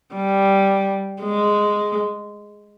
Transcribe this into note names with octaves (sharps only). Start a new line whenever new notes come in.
G3
G#3